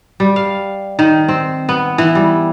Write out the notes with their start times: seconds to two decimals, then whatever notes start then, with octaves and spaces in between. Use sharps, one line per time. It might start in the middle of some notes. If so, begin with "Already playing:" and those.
0.20 G3
0.36 F5
0.99 D#3
1.28 C4
1.69 B3
1.98 E3
2.15 G3